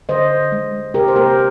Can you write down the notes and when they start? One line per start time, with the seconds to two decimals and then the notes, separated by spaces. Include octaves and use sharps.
0.09 D3 C5 D#5
0.31 D3
0.52 G#3
0.73 G#3
0.94 C3 G4 A#4
1.08 C5
1.16 A#3 G4 A#4